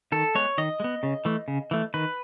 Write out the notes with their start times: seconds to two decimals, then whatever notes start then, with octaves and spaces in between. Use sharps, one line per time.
0.12 D#3 A4
0.35 G#3 B3 C#5
0.58 D#3 D#5
0.80 G#3
0.84 B3
1.03 C#3
1.25 E3 A3
1.48 C#3
1.71 E3 A3
1.94 D#3 B4